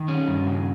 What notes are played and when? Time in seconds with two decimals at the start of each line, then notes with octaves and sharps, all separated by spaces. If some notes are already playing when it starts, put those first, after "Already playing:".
Already playing: D#3
0.08 C#4
0.28 G2
0.47 C#3